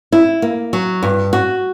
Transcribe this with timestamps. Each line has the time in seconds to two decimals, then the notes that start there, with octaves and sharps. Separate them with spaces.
0.12 E4
0.42 A#3
0.73 F#3
1.03 G2
1.33 F#4